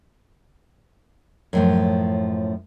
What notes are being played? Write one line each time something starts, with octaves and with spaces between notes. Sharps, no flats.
F#2 A2 F3